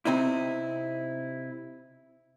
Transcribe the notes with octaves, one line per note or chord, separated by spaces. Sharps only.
C3 C4 D#4 E4